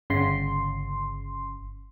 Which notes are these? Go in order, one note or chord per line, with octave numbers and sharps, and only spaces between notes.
G1 C#3 C6